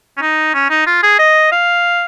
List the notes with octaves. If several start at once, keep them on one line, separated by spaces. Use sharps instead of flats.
C#4
D#4
C#4
D#4
F4
G#4
D#5
F5